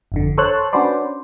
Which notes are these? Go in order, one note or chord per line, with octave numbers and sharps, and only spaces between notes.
G1 F2 D3
A4 C5 C#5 A5 F#6
C#4 D4 F#4 B4 C5 D5